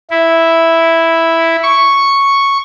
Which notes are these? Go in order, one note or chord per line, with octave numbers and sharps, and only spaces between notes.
E4
C#6